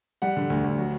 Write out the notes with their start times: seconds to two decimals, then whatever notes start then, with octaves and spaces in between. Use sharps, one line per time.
0.22 G3 F#5
0.37 D3
0.50 D2
0.64 D2
0.78 F#3